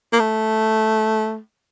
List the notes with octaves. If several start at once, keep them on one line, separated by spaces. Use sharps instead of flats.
A#3
A3